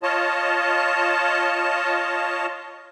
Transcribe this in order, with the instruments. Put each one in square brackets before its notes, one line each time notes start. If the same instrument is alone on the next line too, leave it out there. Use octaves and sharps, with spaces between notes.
[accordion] F4 C#5 D#5 A5